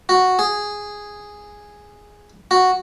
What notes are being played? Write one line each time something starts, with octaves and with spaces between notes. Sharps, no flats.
F#4
G#4
F#4